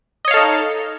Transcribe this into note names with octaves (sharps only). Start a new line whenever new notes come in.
D#4 A4 C#5 D#5 F5